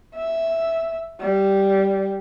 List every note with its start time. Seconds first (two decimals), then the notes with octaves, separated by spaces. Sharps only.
0.15 E5
1.20 G3